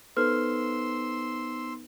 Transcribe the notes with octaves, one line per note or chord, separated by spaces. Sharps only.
B3 D#4 A4 B4 C5 C6 E6 F6